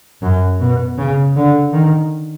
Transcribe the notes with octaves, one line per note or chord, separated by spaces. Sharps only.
F#2
B2
C#3
D3
D#3